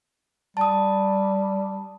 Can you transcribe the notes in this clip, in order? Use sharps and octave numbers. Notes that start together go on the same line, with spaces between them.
G3 A5 D#6